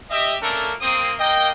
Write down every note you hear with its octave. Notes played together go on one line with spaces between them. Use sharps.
G4 D#5 E5
A3 A#3 C#4 D4 A4 A#4
A#3 C4 D#6
A#3 D#5 G5